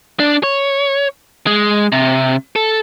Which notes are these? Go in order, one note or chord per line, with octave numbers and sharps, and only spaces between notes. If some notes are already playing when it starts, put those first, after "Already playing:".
D4
C#5
G#3
C3
A4